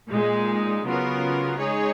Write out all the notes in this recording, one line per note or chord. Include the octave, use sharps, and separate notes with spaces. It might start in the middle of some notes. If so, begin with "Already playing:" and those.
A#2 G#3 D#4
C#3 F#3 B3 F4 A#4
G#3 D#4 G#4 C#5